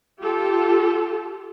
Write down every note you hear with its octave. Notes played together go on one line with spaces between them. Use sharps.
F4 G4 A4